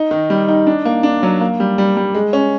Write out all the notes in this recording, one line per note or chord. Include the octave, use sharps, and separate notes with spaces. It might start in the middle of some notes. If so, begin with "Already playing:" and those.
Already playing: D#4
D#3
G3
D#4
D4
A#3
D4
F#3
A#3
G3
G3
G3
G#3
C#4